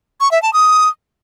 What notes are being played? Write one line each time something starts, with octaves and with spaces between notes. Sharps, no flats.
C#6
E5
A5
D#6